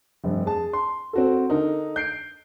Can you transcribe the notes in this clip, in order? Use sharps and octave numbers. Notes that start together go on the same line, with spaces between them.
F1 G2
G#4 A5
C6
C4 F#4 A4
D3 D#4 A#4
G6 C7 D7